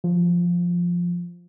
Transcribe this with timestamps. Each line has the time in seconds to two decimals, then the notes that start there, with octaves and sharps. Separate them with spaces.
0.04 F3